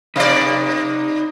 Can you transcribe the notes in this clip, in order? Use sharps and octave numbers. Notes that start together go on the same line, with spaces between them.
C3 D#4 B4 D5